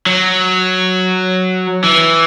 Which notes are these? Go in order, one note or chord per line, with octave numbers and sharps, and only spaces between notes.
F#3
E3